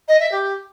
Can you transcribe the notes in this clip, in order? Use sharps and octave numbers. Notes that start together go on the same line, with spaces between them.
D#5
E5
G4